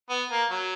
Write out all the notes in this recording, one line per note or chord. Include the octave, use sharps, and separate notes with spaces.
B3
A#3
F#3